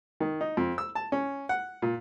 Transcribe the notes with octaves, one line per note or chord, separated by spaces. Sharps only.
D#3
D#4
F2
E6
A5
C#4
F#5
A#2